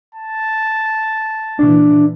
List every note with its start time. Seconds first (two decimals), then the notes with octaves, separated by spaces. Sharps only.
0.15 A5
1.59 A#2 E3 D4